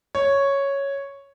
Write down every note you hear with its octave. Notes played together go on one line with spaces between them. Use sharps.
C#5